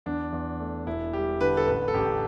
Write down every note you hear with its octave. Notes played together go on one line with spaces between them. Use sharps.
E2 D4
E2
A3
E1 E4
G3 G4
D3 B4
A4
A1 B4
A4
A1 G4